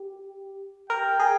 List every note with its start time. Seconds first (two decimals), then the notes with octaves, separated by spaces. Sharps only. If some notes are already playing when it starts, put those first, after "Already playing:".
Already playing: G4
0.90 A#4 G5
1.20 G#4